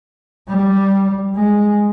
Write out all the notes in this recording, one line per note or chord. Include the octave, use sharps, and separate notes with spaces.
G3
G#3